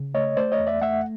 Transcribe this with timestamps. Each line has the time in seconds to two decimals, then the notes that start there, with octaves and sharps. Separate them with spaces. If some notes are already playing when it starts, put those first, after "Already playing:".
Already playing: C#3
0.14 A3 C#5 D#5
0.37 A3 C5 D5
0.52 C#5 D#5
0.59 E2
0.67 D5 E5
0.82 A3 E5 F#5